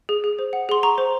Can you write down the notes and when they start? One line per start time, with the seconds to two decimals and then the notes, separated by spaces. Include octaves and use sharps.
0.09 G#4
0.24 G#4
0.39 C5
0.53 F#5
0.69 G#4 C6
0.83 G#4 A#5 C#6
0.98 C5